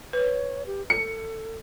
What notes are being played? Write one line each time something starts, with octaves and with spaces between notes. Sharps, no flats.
B4 C#5
G4
A4 C#7